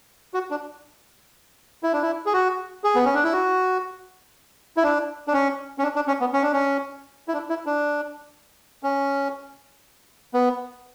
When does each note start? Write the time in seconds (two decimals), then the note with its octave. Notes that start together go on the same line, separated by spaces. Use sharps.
0.34 F#4
0.51 D4
1.83 E4
1.93 D4
2.02 E4
2.26 G#4
2.33 F#4
2.84 G#4
2.95 B3
3.05 C#4
3.14 D4
3.24 E4
3.33 F#4
4.77 E4
4.83 D4
5.28 D4
5.33 C#4
5.79 C#4
5.83 D4
5.95 D4
6.08 C#4
6.20 B3
6.33 C#4
6.43 D4
6.53 C#4
7.28 E4
7.33 D4
7.50 E4
7.66 D4
8.83 C#4
10.34 B3